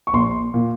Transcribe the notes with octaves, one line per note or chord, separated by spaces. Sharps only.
C#6
A#1 C6
A#2